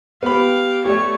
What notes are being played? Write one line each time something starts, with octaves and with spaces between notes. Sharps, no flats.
B3 G4 F5 B5
A3 G4 C#5 D5